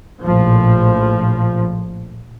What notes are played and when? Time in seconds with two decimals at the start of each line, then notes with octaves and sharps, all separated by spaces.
0.25 A#1 A2 F3